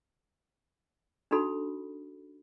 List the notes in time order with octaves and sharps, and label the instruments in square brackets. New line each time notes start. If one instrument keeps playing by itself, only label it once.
[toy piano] D4 D#4 F#4 A4 B5